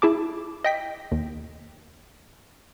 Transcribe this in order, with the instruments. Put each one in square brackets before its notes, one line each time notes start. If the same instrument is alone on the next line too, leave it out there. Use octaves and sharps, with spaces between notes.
[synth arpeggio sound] E4 G#4 A5 D6
D#5 G5 B6
D#2